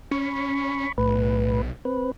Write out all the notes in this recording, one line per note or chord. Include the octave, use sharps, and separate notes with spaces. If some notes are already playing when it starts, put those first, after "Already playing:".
C#4 B5 C#6
B1 A2 B4
C4 B4